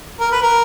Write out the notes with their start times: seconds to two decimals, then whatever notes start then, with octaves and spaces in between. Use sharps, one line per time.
0.20 A#4
0.32 B4
0.42 A#4